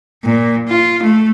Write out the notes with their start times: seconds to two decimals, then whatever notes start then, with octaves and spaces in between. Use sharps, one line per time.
0.24 A#2
0.69 F4
1.03 A3